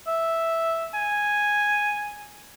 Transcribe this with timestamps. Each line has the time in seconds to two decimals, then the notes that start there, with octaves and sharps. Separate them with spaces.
0.07 E5
0.94 G#5